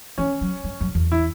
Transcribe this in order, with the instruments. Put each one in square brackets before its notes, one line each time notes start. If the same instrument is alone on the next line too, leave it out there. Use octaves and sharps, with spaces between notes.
[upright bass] E3 [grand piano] C#4
[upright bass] F#3
G2
F#2
E2
[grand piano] E4